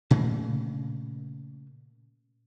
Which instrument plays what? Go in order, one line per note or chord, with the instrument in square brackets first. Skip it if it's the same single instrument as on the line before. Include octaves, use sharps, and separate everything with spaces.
[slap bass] A#2 C#3 A3 A#3